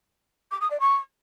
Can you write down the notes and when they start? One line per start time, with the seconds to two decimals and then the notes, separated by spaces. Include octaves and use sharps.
0.51 D6
0.61 D#6
0.71 D5
0.80 C#6